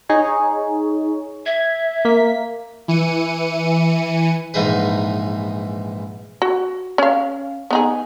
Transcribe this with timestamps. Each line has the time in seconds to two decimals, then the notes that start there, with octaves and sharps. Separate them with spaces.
0.09 D#4 G#4 C#5
1.46 E5 G#6
2.05 A#3 B6
2.88 E3 C#7 D#7
4.54 A#1 G#2 E3 D#4 G#4 B4
6.42 F#4
6.98 C#4 F5
7.70 B3 D#4 G#4